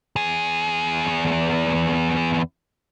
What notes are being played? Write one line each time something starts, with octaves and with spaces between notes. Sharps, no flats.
E2 G#4